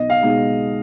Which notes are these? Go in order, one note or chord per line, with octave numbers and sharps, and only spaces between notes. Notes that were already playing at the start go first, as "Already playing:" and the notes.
Already playing: B1 D#5
F5
B2 G#3 D#4